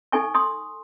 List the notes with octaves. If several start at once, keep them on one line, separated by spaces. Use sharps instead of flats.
D#4 A4 G#5 C#6
C6 D#6